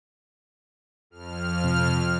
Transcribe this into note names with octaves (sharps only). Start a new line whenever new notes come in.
F2 F6
C3